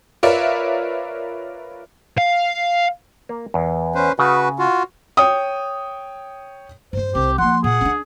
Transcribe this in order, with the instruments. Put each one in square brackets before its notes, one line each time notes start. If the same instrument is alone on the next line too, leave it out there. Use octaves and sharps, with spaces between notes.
[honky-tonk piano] F4 A#4 B4 C#5 D5 E5
[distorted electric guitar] F5
[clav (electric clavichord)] A#3
E2
[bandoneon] C#4 B4 C5
[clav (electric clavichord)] C#3 [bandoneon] F#4 B4
[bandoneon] F4 F#4
[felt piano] C#5 G5 D#6
[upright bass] G2 G#3 [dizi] C5
[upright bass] C2 G3 [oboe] G4
[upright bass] F3 A#3 [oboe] F#5 [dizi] C6
[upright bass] A#2 [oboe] G#4 [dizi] F#5
[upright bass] C#4 D4